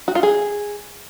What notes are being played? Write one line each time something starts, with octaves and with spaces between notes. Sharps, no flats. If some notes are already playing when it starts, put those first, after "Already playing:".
F#4
F4
G#4